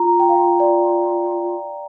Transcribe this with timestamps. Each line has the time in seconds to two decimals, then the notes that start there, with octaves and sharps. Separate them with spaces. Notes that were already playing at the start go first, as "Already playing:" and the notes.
Already playing: F4 A#5
0.20 G5
0.29 F5
0.60 D5